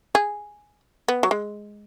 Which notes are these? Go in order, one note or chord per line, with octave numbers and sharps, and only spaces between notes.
G#4
B3
F#3
G#3